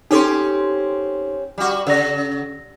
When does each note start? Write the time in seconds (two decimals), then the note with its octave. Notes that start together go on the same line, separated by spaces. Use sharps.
0.11 C4 C#4 D#4 G4 A4 C6
1.58 G3 F#4
1.87 C#3 E6 A#6